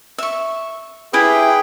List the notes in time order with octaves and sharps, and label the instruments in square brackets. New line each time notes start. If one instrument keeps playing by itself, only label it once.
[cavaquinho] E5 C#6
[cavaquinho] E4 G4 E5 [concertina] G#4 B4 G5